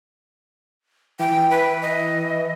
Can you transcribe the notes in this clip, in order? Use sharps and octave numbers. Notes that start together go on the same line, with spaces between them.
E3 G5
B4
D#5